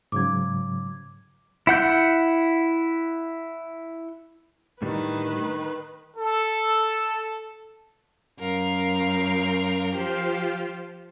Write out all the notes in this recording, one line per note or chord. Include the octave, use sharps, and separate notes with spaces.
G#2 C#3 F#3 D6 G#6
E4 F#5 G6
A2 D3 D#3 G3 B4
A4
F#2 A#4 F5
F3 F4 G4 C5